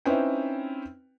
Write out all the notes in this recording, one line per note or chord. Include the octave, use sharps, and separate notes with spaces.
C4 C#4 D#4 E4 B4 G5